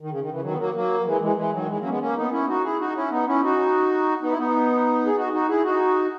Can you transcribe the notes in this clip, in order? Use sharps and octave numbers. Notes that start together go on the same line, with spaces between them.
D#3
C#3
D#3
C#3 E3
D#3 F#3
B3
F#3 A#3
F#3 A#3
F#3
E3 G#3
E3 G#3
E3 G#3
D#3 F#3
E3 G#3
F#3 A#3
C#4
G#3 B3
A#3 C#4
B3 D#4
C#4 E4
D#4 F#4
E4 G#4
D#4 F#4
C#4 E4
B3 D#4
C#4 E4
D#4 F#4
B3 D#4
E4
B3 D#4
G#4
D#4 F#4
D#4 F#4
E4 G#4
D#4 F#4